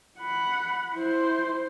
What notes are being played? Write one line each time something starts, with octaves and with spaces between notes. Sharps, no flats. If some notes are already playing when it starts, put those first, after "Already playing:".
F#5 B5
E4 C5